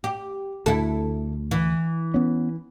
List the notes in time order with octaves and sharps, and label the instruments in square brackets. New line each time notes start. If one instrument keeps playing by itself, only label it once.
[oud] G4
[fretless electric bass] D2 [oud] E4 A4
[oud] E3
[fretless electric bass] B3 C#4